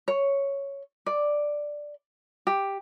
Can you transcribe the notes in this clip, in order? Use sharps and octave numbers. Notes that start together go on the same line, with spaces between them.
C#5
D5
G4